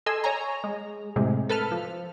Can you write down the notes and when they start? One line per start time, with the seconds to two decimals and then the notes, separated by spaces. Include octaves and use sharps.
0.06 A4 D#5 G#5 C6 E6
0.24 C#5 G#5 A#5
0.64 G#3
1.16 A2 C3 G#3
1.49 A4 B4 A5 F6
1.71 F3